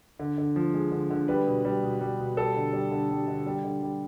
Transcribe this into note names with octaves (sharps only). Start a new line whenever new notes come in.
D3
D3
F3
G#3
D3
D3
G3 B4
B2
G3
B2
G3
B2
G3 A4
D3
G3
D3
G3
D3
G3
D3
G3